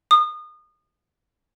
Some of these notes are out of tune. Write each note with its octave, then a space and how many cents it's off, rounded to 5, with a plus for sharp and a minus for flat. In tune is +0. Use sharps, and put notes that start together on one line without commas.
D#6 -30